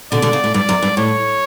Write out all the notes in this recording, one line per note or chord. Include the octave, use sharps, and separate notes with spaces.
B2 D3 D5
B2 D3
C#3
A2
G2 D5
F#2
G2
A2 C#5